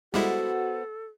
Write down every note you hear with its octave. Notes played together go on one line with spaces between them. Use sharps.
G3 G#3 B3 E4 F#4 A4 C5 F#5